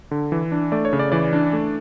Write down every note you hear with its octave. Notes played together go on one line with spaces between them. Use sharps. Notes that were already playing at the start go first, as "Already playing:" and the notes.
D3
E3
D4
A3 D5
C#5
C#3
D5
E3 D5
D4
A3